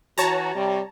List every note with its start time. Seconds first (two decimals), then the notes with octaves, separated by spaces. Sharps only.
0.18 E3 F#4 C#5 A5 A#5
0.55 C3 G3